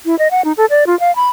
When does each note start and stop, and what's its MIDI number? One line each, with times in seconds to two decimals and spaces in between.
0.06 0.18 64
0.19 0.28 75
0.31 0.44 78
0.45 0.52 63
0.57 0.65 69
0.70 0.87 74
0.87 0.98 65
1.00 1.14 77
1.16 1.29 83